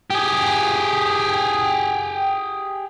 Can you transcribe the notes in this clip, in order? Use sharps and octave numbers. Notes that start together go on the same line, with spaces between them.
G4 G#4